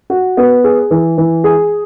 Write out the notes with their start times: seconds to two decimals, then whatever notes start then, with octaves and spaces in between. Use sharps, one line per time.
0.10 F#4
0.37 B3
0.64 G#4
0.90 E3
1.17 E3
1.44 G#4